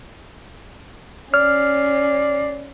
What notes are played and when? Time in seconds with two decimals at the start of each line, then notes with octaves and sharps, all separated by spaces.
1.34 C#4 D5 F6 C7